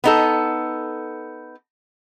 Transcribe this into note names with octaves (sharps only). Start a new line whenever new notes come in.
B3 D#4 A4